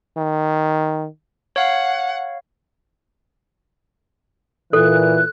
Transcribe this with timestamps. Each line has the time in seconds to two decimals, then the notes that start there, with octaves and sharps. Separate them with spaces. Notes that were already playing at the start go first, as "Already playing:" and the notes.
0.17 D#3
1.56 C#5 F5 F#5
4.73 A#2 E3 A4 F#6